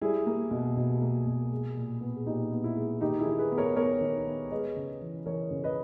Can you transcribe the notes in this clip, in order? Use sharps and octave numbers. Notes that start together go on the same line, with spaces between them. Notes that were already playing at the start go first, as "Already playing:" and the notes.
G3 E4 G#4
A#3
B2
B2
A#3
B2
G#3
A#2
B3
G#4
A#2 D#4 G4
B3
E4
G#3
D#3 D#4 G4
E4 G#4
D#3
G#4 B4
B3
A#4 C#5
B3 A#4 C#5
D#3
B3
G#3 B4 D#5
C#3
E3
E3 A#4 C#5
C#3
B4 D#5